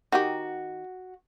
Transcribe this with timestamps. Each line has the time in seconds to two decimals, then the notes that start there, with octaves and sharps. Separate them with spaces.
0.12 D#3 D#4 F#4 G4